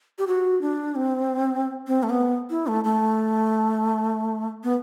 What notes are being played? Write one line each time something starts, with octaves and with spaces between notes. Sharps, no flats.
G4
F#4
D4
C4
C4
A3
B3
E4
A3
A3
B3